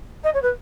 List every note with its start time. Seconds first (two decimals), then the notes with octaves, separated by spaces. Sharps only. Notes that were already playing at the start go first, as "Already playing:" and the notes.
0.24 D#5
0.34 C#5
0.42 B4